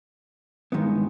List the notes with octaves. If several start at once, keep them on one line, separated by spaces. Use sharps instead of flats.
G2 D#3 G#3 B3 E4